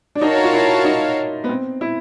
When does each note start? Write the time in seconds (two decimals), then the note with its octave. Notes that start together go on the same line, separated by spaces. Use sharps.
0.15 D4
0.21 D#4 F#4 A#4 C#5 F5 A5
0.44 F4
0.53 E4
0.85 D#4
1.44 B3
1.49 C4
1.81 E4